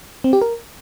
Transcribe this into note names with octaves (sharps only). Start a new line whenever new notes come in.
C4
G4
A#4